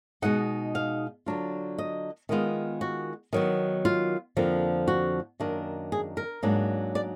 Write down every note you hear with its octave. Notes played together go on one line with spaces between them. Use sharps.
B2 G#3 D#4 F#5
F5
D3 F#3 D4 F4
D#5
D#3 G#3 B3 F4
F#4
D#3 F#3 B3
F4
F2 D3 F3 A#3
F#4
F#2 D#3 A#3 D4
G#4
A#4
G#2 F#3 A#3 D4
D5